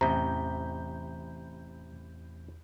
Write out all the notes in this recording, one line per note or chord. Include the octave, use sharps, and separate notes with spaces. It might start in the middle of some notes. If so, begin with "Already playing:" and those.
A1 E2 C3 A#5 B5 G6